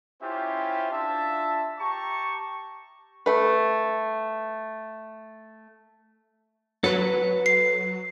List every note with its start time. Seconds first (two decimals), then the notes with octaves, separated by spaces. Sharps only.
0.22 C#4 E4 F4 G4 C5 E5
0.92 D4 F4 E5 A5
1.79 G4 A5 A#5 C#6
3.26 A3 B4
6.84 F#3 A4 B4
7.46 C7